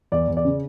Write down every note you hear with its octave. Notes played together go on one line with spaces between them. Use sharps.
E2 D5
E2
D5
C#3